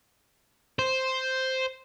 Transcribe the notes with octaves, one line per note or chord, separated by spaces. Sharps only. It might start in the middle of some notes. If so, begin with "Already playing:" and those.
C5